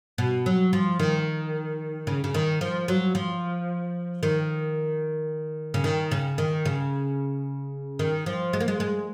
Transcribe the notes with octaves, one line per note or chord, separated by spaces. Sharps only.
B2
F#3
F3
D#3
C#3
C#3
D#3
F3
F#3
F3
D#3
C#3
D#3
C#3
D#3
C#3
D#3
F3
G#3
A#3
G#3
G#3